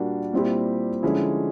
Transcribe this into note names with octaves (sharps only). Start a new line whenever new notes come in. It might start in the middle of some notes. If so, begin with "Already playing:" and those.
Already playing: A#2 G3 A#3 D4 F#4
A#2 G3 C4 E4 G4
D3 F3 G#3 C#4 E4